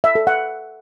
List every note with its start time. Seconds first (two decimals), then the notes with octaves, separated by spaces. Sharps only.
0.04 E5
0.15 A4
0.27 F#5